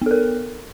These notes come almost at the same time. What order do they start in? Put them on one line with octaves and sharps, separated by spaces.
B3 A4 A#4